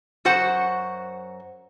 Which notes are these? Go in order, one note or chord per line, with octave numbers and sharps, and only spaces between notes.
F#2 F#4 C5 F#5